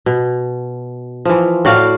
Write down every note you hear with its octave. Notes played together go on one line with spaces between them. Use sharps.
B2
E3 F3
A2 F#4 D5 F5